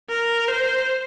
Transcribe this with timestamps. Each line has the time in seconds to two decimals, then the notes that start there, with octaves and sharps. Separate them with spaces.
0.09 A#4
0.48 C5